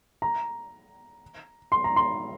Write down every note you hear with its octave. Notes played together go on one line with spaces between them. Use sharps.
A#5
C6
A#5
C6